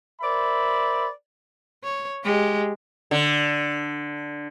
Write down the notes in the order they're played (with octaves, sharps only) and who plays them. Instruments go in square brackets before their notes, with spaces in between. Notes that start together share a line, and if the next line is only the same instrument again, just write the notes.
[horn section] A#4 C5 D5 E5 B5
[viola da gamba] C#5
G#3 G4
[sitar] D3